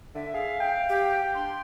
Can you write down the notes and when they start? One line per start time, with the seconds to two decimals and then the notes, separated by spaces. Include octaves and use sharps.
0.15 D3 E5
0.34 G#4 F5
0.61 G5
0.89 G4
1.35 D4 C6